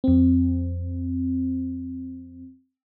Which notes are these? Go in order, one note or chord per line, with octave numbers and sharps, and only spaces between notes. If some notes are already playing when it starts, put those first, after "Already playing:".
F2 C4